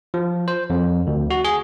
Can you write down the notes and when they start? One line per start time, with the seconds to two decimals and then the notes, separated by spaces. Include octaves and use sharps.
0.14 F3
0.48 C5
0.70 F2
1.07 D2
1.31 F#4
1.45 G#4